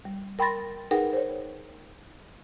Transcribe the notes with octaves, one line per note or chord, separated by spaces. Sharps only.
G3
A#4 G5 B5 C6 A6 A#6
D#4 G#4 A#4 B4 F#5 G5
C5 C#5